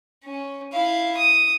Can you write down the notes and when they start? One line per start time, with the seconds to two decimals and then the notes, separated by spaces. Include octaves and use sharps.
0.24 C#4
0.73 E4 F5
1.17 D#6